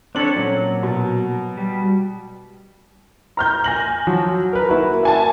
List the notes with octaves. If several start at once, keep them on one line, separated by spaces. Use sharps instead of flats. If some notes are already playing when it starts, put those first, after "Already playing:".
C4 D4 A4 C#5 F#7
A#2 F#3 C#4
B2
G3
A#5 F6 G6
G#5 A#6 F#7
F3 F#3
A#4 B4
A#3 E4 F#4
E5 G#5 A5